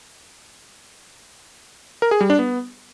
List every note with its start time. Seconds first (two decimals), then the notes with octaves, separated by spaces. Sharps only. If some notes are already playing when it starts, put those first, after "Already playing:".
2.02 A#4
2.11 G#4
2.21 G3
2.30 D4
2.39 B3